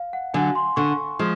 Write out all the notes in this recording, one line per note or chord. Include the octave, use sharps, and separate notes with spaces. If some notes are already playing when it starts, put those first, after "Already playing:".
Already playing: F5
F#5
D3 F#3 G#5
C6
D3 C#6
F3 G#3